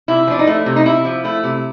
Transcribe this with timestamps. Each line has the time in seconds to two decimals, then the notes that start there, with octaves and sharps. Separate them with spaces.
0.08 C3 E4
0.27 F3 D4
0.39 D#4
0.47 A3 E4
0.66 C3
0.76 D#4
0.86 C3 E4
1.05 F3
1.24 A3 E4
1.43 C3